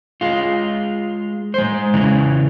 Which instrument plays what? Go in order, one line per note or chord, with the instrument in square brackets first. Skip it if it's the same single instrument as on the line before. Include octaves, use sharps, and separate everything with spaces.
[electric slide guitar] G#3 F4
G#3 C5
C#3 E3 C#4